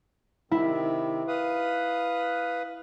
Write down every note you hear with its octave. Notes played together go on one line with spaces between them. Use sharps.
C3 D#3 C4 E4
B4 F5 D#6